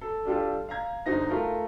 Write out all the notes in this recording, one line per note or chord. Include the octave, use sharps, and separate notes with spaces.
A4
G3 D4 F4 G4 A4
F5 A#5 G#6
G1 D3 D#4 C5 A#6
A3 F4 A#4